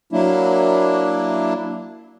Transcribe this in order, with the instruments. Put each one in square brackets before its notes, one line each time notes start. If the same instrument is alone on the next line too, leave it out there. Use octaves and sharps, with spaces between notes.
[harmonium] F#3 A#3 D4 E4